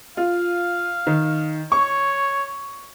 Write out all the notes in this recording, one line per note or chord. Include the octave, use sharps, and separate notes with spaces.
F4 F5
D#3
C#5 C#6